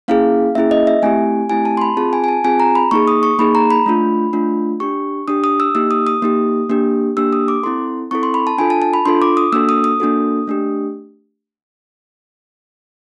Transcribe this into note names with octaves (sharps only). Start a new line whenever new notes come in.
A#3 C#4 E4 G#4 F5
A#3 C#4 E4 G#4 E5
D#5
E5
A3 C4 E4 G4 G#5
A3 C4 E4 G4 G#5
A5
C6
B5
C4 F4 G#4 A5
G#5
G#5
A5
C4 F4 G#4 G#5
A#5
B5
A#3 D#4 G#4 C#6
D#6
C#6
A#3 D#4 G#4 B5
A#5
B5
A3 D4 F4
A3 D4 F4
D4 G4 C#6
D4 G4 D#6
D#6
E6
A#3 D#4 G4 E6
D#6
D#6
A#3 D#4 G4
A#3 D4 G4
A#3 D4 G4 E6
D#6
D6
C4 E4 A4 C6
C4 E4 A4 C#6
C6
B5
A5
D4 F4 A4 G#5
A5
A5
B5
D4 F4 A4 C6
D6
D#6
A#3 D4 F#4 A4 E6
D#6
D#6
A#3 D4 F#4 A4
A3 D4 G4